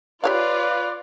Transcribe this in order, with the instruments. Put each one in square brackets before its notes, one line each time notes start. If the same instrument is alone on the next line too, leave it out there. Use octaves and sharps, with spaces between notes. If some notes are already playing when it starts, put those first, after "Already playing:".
[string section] F4 [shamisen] G4 C#5 F5 [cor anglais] B4 [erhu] D5